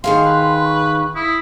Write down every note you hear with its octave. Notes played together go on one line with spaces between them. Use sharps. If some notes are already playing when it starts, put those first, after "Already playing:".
D#3 G#4 F5 C6
B4
C#6
E4 D#6